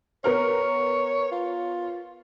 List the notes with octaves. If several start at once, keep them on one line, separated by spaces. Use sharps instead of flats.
B3 A#4 C#5 F6
F4